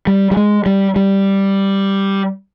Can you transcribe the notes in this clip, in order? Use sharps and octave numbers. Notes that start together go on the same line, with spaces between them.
G3
G3
G#3
G3
G3